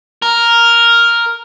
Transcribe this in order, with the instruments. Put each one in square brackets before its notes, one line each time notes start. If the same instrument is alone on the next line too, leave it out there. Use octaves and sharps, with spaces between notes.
[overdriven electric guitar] A#4